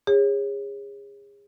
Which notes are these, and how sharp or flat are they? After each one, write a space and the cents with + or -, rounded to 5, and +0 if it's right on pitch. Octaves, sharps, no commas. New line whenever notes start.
G#4 -35 C#5 -20